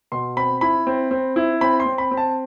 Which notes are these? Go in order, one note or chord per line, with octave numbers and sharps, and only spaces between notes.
B2 C6
C4 B5
E4 B5
C4
C4
E4
C4 B5
C6
C4
B5
C4
A5